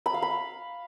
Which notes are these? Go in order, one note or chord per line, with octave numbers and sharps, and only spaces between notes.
B5
F5
B5